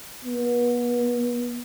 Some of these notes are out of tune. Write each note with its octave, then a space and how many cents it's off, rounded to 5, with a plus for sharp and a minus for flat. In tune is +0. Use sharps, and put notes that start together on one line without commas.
B3 -35